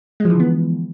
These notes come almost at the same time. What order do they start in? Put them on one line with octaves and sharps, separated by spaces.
G#3 F3 E3 D3 B3